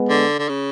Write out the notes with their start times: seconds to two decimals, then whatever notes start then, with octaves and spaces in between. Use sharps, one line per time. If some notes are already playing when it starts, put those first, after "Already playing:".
Already playing: G#3 B3
0.09 D3
0.39 D3
0.49 C#3